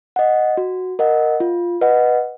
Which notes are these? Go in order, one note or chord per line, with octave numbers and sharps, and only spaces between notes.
D#5 F#5
F#4
A#4 D#5 F#5
F4
B4 D#5 F#5